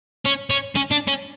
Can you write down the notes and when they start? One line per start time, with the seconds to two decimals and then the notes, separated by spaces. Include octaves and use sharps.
0.26 C#4
0.50 C#4
0.75 C#4
0.91 D4
1.07 C#4